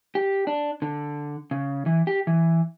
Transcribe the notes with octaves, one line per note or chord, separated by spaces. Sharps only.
G4
D4
D3
C#3
E3
G4
E3